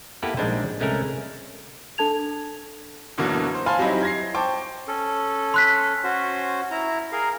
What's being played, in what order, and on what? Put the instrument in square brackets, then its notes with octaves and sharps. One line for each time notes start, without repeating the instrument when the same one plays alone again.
[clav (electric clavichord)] A#3 B3 E4 G4 A4 B4
A#1 G3 G#3 D4 D#4 C5
C2 G#3 A3 C#4 A#4 G#5
[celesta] D4 A4 A5 G#6 F7
[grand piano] F#2 B2 D3 E3 F#3 A#3
C5
C5 F5 G#5 A5 B5 C6
F#3 G3 C4 D#4 E4
G#6 A#6 C7
C5 G5 A5 C#6 D6
[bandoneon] C#4 A4
[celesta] C6 F#6 B6
[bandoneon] C#4 F#4 C5
E4 A#5
G#4 A#4 F5